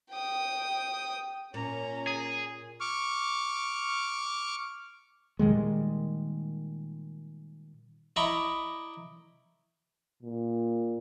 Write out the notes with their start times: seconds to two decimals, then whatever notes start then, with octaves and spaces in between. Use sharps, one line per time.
0.11 G5 D#6
1.54 A#2 C#4 A#5
2.07 G#4
2.80 C#6 D6 F6
5.39 A#2 D#3 G3 G#3
8.16 E4 D5 D#5 A#5 B5 C#6
10.23 A#2